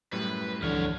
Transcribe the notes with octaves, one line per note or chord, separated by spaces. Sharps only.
F#2 A2 G3 B4
C#2 G2 D3 E3 F3 C#5 F6